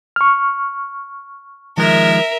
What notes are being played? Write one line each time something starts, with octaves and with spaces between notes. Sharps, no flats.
C#6 F6
D#3 F3 G#3 A#4 E5